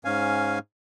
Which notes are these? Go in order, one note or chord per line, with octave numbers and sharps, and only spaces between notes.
G#2 C#4 F5 G#5